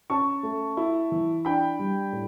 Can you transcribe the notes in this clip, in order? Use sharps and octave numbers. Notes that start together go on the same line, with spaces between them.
C#4 A5 C#6
A3
E4
E3
D4 G5 B5
G3
A2